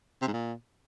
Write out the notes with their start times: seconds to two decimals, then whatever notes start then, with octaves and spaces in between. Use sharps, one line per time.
0.22 C3
0.27 G#2
0.33 A#2